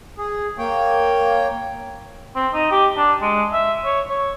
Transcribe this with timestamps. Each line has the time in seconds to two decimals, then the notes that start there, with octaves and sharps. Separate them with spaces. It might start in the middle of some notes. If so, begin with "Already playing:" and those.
0.18 G#4
0.58 A#3 C#5 G5
2.36 C4
2.54 D#4
2.71 G4
2.96 D4
3.22 G#3
3.53 E5
3.85 C#5
4.09 C#5